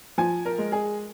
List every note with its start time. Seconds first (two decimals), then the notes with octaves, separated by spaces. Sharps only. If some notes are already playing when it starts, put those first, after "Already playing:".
0.18 F3 G#5
0.45 A#4
0.58 G#3
0.72 G#4